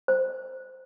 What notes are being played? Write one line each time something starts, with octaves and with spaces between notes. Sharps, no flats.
C5